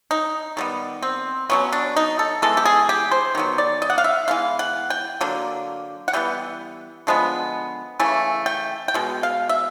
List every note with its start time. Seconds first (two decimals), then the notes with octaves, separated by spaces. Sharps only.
0.11 D#4
0.57 D#3 G3 B3
1.02 C4
1.50 B2 F#3 B3 C#4
1.73 D4
1.96 D#4
2.19 A4
2.42 E3 G#3 B3 A4
2.57 G4
2.65 G#4
2.89 G4
3.11 C5
3.35 D#3 F#3 B3
3.58 D5
3.82 D#5
3.90 F#5
3.98 F5
4.04 E5
4.28 E3 G#3 B3 F5
4.59 F#5
4.90 G5
5.21 D3 F#3 A#3
6.08 F#5
6.13 E3 G3 B3 G5
7.07 D3 F3 G#3 B3
8.00 C#3 E3 A3 G#5
8.46 G5
8.88 G5
8.94 B2 G#3
9.23 F5
9.49 E5